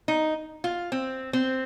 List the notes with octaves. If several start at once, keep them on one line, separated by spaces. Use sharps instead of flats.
D#4
F4
C4
C4